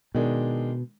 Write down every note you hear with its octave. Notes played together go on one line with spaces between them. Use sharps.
B2 D#3 G#3 D4